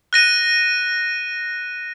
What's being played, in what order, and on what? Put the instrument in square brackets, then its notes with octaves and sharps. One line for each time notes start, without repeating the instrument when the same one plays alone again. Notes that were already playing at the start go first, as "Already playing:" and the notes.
[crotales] F#6 A#6 D#7